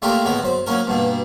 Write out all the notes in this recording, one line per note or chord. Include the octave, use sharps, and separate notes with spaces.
A3 A#3 D4 F4 G4 A#4
A2 G#3 B3 A#4
F#2 C5
F#3 A#3 C#4 A#4
G2 B2 A#3